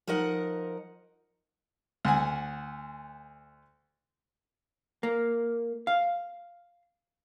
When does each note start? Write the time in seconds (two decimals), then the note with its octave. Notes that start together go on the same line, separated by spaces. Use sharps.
0.07 F3 D#4 A#4 D#5 F#5
2.05 D2 F#5 G#5
5.03 A#3
5.87 F5